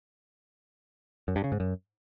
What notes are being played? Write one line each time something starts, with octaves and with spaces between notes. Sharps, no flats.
F#2
G2
C#3
G#2
F#2